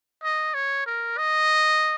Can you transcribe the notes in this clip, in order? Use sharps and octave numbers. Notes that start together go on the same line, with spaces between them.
D#5
C#5
A#4
D#5